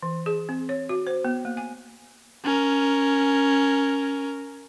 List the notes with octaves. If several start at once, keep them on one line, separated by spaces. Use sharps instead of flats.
E3
G#4
C4
C#5
F#4
C5
B3
A#3
G#5
C#4 A#4